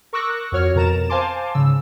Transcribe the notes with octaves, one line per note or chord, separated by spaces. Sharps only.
A#4 C#6 D6 E6 F#6 A#6
F2 F#4 C#5 F6
F2 B2 A#4 A#5 A6 E7
C5 F5 G#5 A5 C6 D6
G#2 C#3 E6